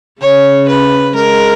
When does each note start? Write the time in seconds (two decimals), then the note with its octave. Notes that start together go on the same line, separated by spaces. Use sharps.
0.21 C#3 C#5
0.68 B4
1.15 G#3 A#4